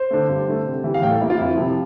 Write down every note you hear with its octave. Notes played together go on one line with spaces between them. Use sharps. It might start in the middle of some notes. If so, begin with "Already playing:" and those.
Already playing: C5
D3 A3
G2
D3 A3
C3
E3 G3
F5
A2 G5
A4
G3 A#3 E4
F4
F2 E4
C3 F3